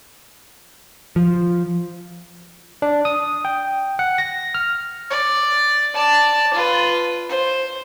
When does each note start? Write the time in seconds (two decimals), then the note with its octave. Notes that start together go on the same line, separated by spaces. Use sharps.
1.16 F3
2.82 D4
3.05 D#6
3.45 G5
3.99 F#5
4.18 A#6
4.54 F6
5.10 D5
5.94 D5 A5
6.54 F4 B4
7.29 C5